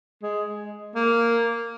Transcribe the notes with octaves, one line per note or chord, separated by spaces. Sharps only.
G#3
A#3